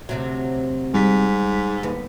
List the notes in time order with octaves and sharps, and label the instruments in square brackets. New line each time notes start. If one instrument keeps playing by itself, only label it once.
[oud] D2 C3 F#3
[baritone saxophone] G#2 [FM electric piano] G3 B6
[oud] D#2 B3